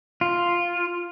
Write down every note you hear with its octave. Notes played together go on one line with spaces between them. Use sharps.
F4